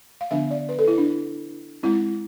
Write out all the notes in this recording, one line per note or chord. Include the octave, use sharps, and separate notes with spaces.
F5
D3 F3 B3 D4 E5
D5
B4
A4
E4
D4
G#3 C4 E4